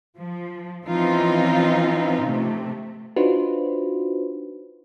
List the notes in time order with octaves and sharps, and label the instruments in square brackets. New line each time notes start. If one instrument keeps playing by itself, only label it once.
[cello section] F3
E3 F3 C4 C#4 D#4 F4
C3 A3
[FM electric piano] D4 D#4 F4 F#4 B4 C5